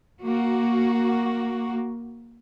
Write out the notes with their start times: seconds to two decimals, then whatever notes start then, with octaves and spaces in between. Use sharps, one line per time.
0.23 A#3 F#4